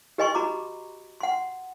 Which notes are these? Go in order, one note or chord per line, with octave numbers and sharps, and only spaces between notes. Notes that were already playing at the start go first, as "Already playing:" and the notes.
G4 B4 D#5 G#5 C6 C#6
F#4 A#5 B5 D6
F#5 C6